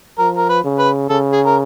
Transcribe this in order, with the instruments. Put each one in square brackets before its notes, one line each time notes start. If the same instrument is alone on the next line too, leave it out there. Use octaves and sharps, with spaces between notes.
[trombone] F3 [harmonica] A#4
[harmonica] A#4
B4
[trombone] C#3
[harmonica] B4
[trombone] C#3 [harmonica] A4
[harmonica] G#4
A#4